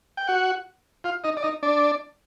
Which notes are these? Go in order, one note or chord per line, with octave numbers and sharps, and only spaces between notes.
G5
F#4 F#5
F4 F5
D#4 D#5
D5
D#4 D#5
D4 D5